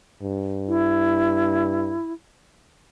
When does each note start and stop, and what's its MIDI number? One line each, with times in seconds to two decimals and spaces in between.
0.23 1.99 43
0.68 2.13 64